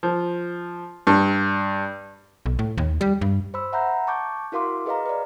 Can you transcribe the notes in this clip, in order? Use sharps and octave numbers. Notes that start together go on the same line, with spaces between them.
F3
G2
B1
A2
D#2
G3
G2
C5 B5 E6
E5 F#5 A#5 B5 G6
A5 C#6 D6 G6
E4 F#4 A#4 F5 C6 D6
G#4 B4 D#5 F5 A#5
B4 D5